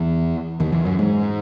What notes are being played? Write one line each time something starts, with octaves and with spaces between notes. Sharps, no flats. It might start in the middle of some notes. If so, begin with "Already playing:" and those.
Already playing: E2 E3
D#2 D#3
E2 E3
F#2 F#3
G#2 G#3